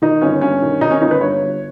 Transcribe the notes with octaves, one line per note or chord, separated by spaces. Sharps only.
D#3 D#4
G1 C#4
G2 C#4
D#3
D#3 D#4
C#4
G1 D#4
B4
G2 C#5
G1